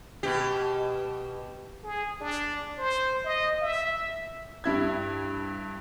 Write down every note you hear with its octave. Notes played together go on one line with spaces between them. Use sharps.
B2 G4
G#4
D4
C5
D#5
E5
G2 E4 G#6